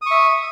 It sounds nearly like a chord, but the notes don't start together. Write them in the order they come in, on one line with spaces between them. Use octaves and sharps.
D#6 C#6 E5